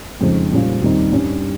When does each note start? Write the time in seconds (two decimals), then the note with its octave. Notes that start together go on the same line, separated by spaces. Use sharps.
0.21 F2 C#3 G#3 D#4
0.51 A#2 G3 C#4 F4
0.82 D#2 D#3 G3 C4 D#4
1.12 G2 G3 C#4